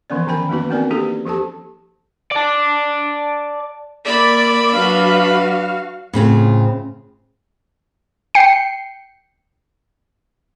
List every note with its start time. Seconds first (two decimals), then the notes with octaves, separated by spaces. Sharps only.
0.10 E3 F3 B3 C#4 D5
0.27 D#3 C#4 G5 B5
0.49 A#3 B3 D#4 F#4 B4
0.70 B3 C4 D4 A#4 D5 G#5
0.90 A#3 C#4 D#4 G4 A4 B4
1.25 F3 G4 A4 A5
2.32 D5 A5
4.05 A#3 D5 E5 B5
4.73 F#3 D4 F#4 B4 F5
6.13 A2 C#3 C4 F4
8.35 G5 C7 C#7